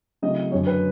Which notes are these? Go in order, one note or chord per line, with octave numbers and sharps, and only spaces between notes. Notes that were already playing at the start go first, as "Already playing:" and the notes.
C#3 F#3 A3 C4 E4 D#5
F#2 D3 F#3 C#5
B4